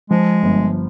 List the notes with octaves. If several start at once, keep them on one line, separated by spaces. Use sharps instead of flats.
F3 G#3
G1